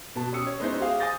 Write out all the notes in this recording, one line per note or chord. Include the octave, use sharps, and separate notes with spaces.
B2 B3 A5
C#4 G4 D#6 E6 C#7
C#5
G#3 B3 C#4 D#4 E4 C5
G4 G#4 C5 F5
G#5 D6 D#6 G6 A6 A#6